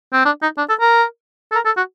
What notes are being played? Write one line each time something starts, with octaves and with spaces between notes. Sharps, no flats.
C4
D4
D#4
D4
A4
A#4
A4
A#4
A4
F#4